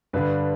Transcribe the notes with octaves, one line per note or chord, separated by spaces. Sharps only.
G2 D3 B4